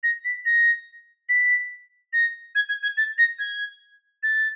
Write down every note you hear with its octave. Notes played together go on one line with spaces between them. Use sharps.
A#6
B6
A#6
B6
A#6
G#6
G#6
G#6
A6
A#6
G#6
A6